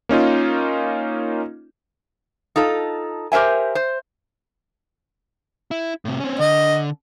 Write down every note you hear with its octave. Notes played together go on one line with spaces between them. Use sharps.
A#3 C#4 D#4 F4
D#4 F4 A4
G4 A#4 C5 E5 G#5
C5
E4
A2 C3
C4 C#4
D3 D#5